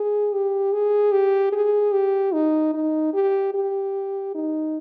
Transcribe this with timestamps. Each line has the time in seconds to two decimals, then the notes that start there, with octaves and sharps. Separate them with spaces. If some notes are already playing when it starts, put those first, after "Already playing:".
Already playing: G#4
0.32 G4
0.72 G#4
1.12 G4
1.52 G#4
1.92 G4
2.33 D#4
2.74 D#4
3.14 G4
3.54 G4
4.35 D#4